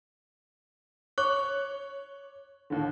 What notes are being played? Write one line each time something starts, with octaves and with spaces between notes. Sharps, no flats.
C#5 C#6 D6 F#6
D#2 A2 D3